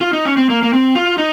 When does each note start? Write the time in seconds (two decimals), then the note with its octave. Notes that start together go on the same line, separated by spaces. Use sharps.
0.01 F4
0.13 D#4
0.25 C#4
0.37 C4
0.50 A#3
0.63 A#3
0.73 C4
0.95 F4
1.18 D#4